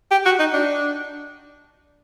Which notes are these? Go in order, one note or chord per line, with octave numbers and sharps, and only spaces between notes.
G4
F#4
D#4
D4